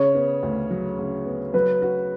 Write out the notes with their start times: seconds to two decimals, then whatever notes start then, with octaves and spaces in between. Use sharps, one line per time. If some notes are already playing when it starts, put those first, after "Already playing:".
Already playing: C#3 C#5
0.15 B3
0.43 D2
0.71 F#3
0.99 C#3
1.26 B3
1.54 F#3 B4
1.82 F#4